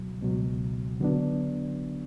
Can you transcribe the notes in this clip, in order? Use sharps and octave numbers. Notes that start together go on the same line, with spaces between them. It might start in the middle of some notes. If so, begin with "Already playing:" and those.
Already playing: C#2 B2 F#3
C#2 B2 F#3
D3 F#3 B3 D4